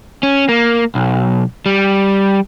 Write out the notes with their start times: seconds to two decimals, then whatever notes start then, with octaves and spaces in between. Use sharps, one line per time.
0.23 C#4
0.49 A#3
0.95 B1
1.66 G3